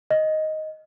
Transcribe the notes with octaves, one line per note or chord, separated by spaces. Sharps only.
D#5